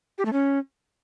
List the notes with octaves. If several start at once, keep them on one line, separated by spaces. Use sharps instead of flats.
G4
A3
C#4